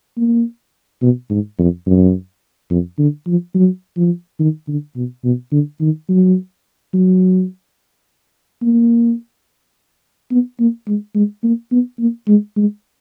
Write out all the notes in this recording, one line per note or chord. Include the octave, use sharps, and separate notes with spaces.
A#3
B2
G#2
F2
F#2
F2
D3
F3
F#3
F3
D#3
D3
B2
B2
D3
D#3
F#3
F#3
A#3
B3
A#3
G#3
G#3
A#3
B3
A#3
G#3
G#3